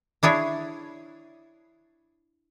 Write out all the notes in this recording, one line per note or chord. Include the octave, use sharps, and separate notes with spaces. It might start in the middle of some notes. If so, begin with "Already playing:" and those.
D4 E4 G#4 C#5